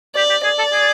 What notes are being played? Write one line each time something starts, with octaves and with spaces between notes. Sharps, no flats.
G4 D5
G4
G#4 D5
A4
G#4